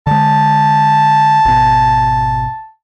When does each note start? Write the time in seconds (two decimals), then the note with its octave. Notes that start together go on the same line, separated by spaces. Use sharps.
0.07 D3 G#3 A5
1.45 G#1 B2